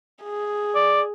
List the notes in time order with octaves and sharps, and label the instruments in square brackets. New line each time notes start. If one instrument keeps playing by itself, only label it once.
[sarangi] G#4
[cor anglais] D5